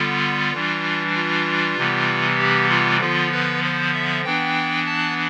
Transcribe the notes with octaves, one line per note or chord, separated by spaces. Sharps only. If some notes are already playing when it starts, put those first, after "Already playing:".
Already playing: D3 G3 B3 F4
E3 G3 D4
F4
C3 E3 G3 B3
G4
F4
D3 F3 B3 F4
B4
C5
E5
E3 B3 D4 G5
A5